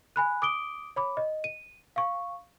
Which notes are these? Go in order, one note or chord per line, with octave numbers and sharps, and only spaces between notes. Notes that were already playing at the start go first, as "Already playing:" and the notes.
G#5 B5 F#6
D6 D#6 D7 G7
C#5 B5 D6
D#5
D#7
F5 C#6